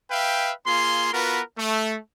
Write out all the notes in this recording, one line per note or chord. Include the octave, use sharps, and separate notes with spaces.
B4 E5 F5 G5
A#3 F4 G#4 C6
B3 F4 F#4 A#4 B4
A3